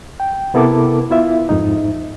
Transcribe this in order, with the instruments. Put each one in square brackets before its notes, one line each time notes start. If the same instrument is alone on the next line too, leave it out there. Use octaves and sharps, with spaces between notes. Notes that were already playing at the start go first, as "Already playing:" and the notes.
[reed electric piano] G5
C3 B3 E4 A4 A#4 D6
B3 E4 F4 E5
F2 G#2 D#4